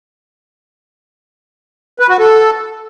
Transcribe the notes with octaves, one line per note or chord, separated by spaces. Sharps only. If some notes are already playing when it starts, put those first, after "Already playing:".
B4
F#4
A4